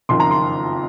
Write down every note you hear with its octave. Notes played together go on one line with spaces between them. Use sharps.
F#1 F2 D#3 C6
A#5
C6